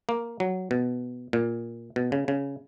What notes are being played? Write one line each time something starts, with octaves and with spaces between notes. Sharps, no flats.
A#3
F#3
B2
A#2
B2
C#3
C#3